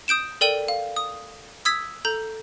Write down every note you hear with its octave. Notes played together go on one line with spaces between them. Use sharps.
D#6 G6 D7 E7
A4 A#4 D5 G5 D#7 F#7
F5
D#6
D#6 E6 G#6 B6
A4 A#5 G6